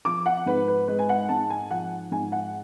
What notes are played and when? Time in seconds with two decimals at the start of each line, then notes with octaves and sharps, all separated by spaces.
0.05 F3 D6
0.26 F#5
0.46 G#2 B4
0.68 B4
0.88 G#3 B4
0.99 G#5
1.09 F#5
1.29 G#2 A5
1.50 G#5
1.71 F3 F#5
2.12 G#2 G#5
2.32 F#5